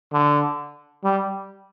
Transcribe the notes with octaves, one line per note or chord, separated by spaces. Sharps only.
D3
G3